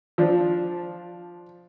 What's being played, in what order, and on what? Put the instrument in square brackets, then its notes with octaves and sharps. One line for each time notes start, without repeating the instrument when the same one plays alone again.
[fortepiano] F3 D4